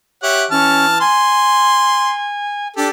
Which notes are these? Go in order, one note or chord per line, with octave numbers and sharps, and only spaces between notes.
G4 C#5 E5 F#5
E3 C#4 A5 F6
G#5 C6
D4 G4 A4